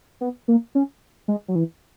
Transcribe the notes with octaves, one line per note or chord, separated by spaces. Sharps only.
B3
A#3
C#4
G#3
F#3
E3